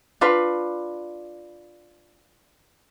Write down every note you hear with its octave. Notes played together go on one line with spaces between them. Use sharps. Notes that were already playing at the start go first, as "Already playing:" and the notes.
D4 F4 B4